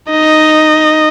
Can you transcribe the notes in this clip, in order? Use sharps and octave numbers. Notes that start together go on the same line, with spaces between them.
D#4 D#5